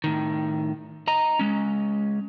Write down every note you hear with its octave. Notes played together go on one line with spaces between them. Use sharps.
A2 D#3
D#5 A#5
G#3 C#4